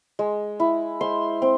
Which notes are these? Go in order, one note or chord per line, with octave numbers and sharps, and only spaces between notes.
G#3
E4
G#3 C5 C6
C4